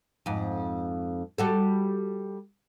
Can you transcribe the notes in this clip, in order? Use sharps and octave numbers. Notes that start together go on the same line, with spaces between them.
F2 G#2
G3 F#4 A4